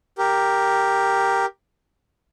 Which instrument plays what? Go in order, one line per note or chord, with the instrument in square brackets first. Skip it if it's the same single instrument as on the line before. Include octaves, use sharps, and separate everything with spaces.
[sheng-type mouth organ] G4 A#4